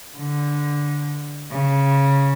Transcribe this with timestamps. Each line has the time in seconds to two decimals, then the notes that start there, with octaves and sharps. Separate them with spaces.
0.18 D3
1.51 C#3